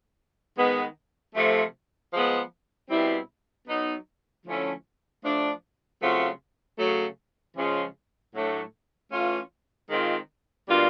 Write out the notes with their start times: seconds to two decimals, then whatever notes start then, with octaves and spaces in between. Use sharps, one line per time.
0.57 D#3 G#3 B3
1.35 C3 F3 A3
2.12 F3 G#3 B3
2.90 B2 G3 C4 E4
3.67 F#3 B3 D#4
4.45 D3 F3 A3 C#4 E4
5.23 F3 A3 D4
6.01 C#3 F#3 A3 C4 F4
6.78 C#3 F#3 A3
7.56 C#3 F3 G#3 C#4 F4
8.33 A2 F#3 A3 D4
9.11 E3 A3 C#4 F4
9.89 D#3 G#3 C4 F4
10.67 B2 G3 A#3 D4 F4